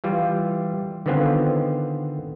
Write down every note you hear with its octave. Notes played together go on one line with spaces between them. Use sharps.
E3 G3 F4
D3 D#3 B3 C4 F4 G#5